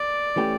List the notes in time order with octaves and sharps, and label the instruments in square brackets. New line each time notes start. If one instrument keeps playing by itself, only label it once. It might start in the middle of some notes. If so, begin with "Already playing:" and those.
Already playing: [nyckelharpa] D5
[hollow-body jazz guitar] E3 A3 C#4 G4